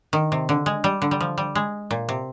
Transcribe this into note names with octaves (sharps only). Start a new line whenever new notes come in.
D#3
C3
D3
G#3
G3
D3
G3
F3
G3
G#3
A#2
C3